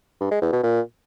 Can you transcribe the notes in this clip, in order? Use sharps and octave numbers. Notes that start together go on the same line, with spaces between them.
G2
G#3
E2
B2
A#2